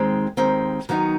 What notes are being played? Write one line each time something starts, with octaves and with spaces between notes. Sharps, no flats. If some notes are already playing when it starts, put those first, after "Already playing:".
Already playing: D#2 D#3 G#3 C4
D#2 D#3 G#3 C4
D#3 F#3 B3 D#4